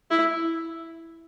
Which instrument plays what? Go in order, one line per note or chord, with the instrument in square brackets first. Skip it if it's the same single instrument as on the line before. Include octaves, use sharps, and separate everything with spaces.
[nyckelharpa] E4